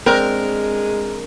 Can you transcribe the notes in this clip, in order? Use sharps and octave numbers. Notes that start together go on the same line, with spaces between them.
G#3 C4 D4 A#4